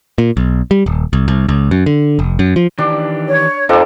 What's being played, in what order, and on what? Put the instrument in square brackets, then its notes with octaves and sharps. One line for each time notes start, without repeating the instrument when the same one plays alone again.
[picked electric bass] A#2
B1
G3
D#1
C2
C2
C#2
F#2
D3
F1
F#2
F3
[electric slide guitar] D#3 E3 G4 [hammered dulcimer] D4
[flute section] C#5
[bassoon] F2 [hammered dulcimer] D4 A4 A#4 [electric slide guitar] D#4